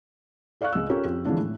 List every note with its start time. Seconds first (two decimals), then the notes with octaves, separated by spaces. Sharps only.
0.61 A4 D5 F5 C#6 F#6
0.73 C#2 D#5 E6
0.90 C#4 F4 G4 A4 A#4 C#5
1.05 F2 G4
1.25 D3 E3 F3 G#3 C#4 D4
1.38 A2